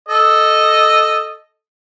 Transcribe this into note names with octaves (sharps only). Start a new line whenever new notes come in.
A4 D#5